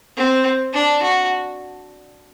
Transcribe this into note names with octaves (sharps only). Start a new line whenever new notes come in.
C4
D4
F#4